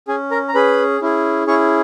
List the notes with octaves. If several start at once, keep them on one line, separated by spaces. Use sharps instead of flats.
C#4 G#4 G#5
A#4 A#5
A#5
C#4 G#4 B4 B5
C#4 E4 G#4
C#4 E4 G#4 C#5 C#6